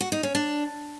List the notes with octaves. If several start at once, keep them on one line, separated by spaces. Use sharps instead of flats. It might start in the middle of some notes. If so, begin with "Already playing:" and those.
F#4
D#4
C#4
D4